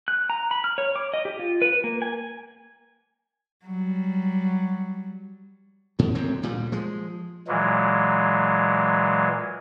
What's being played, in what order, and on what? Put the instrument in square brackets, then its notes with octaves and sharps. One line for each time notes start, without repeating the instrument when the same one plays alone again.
[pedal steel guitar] F#6
A#5
B5
F6
C#5
D6
D#5
G4
F4
B4
A#3
G#5
[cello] F#3 G3
[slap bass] D2 G#2 B2
D1 G#1 F#2 C4
D2 A#2 G3
F3 G#3
[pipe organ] A#2 E3 F#3 G#3